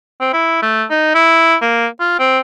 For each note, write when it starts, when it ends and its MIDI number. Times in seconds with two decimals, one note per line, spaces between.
0.21 0.28 60
0.33 0.57 64
0.62 0.85 57
0.90 1.11 63
1.15 1.56 64
1.62 1.86 58
2.00 2.14 65
2.19 2.39 60